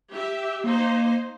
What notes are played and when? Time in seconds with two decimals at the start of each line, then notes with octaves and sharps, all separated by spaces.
0.12 G4 E5
0.64 A#3 D#4 C5